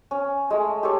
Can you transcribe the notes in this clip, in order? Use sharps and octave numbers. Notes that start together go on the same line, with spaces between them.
C#4
G#3 A3
G4 A4 C#5